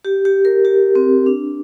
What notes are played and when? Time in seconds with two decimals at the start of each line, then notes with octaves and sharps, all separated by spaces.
0.05 G4
0.25 G4
0.45 A#4
0.65 G4
0.95 C4
1.26 D4